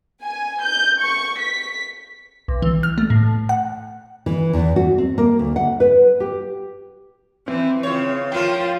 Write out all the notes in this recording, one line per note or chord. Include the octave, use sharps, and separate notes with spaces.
G#5
G6
C#6
B6
B1
E3
F6
A3
A2
F#5
E3
E2
F#4
C4
A#3
D2
F#5
B4
G4
E3 C4
C#3 E3 F4 C#5
F3 A#3 F4 G5